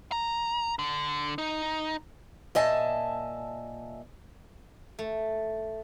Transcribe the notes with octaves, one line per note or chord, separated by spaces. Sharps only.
A#5
D3
D#4
A#2 D#5 E5 G#5 A5
A3